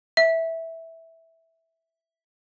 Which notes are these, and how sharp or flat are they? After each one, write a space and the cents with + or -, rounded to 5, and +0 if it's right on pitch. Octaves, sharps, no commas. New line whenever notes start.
E5 -10